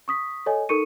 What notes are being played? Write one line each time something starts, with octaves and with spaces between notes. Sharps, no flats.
C#6 D#6 B6
A4 C#5 D#5 G#5
D#4 A4 A#4 C#6 C#7 D#7